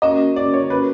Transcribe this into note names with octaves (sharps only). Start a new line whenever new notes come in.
A#3 C#4 F#4 A#4 D#5
D5
C#5
B4